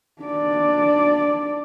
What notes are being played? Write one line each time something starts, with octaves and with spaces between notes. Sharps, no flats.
D4 D5